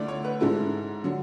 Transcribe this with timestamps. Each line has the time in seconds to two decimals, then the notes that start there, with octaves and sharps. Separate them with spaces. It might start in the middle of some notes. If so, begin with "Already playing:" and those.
Already playing: D2 D3 A3 E4 D5
0.08 C#5
0.25 B4
0.40 G#2 G#3 C#4 E4 A4
1.04 D3 F#3